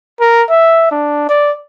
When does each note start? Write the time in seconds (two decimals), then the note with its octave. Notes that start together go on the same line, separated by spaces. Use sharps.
0.20 A#4
0.50 E5
0.91 D4
1.29 D5